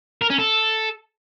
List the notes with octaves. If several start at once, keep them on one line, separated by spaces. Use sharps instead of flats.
A#4
C#4
A4